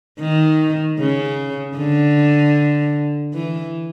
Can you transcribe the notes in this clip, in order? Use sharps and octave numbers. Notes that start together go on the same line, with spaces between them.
D#3
C#3
D3
E3